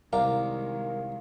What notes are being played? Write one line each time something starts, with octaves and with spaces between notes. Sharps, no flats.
C2 D#3 G#3 A#4 D5 F5 A#5